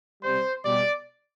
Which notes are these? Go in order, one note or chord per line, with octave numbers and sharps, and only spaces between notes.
C3 G3 C5
B2 G3 D5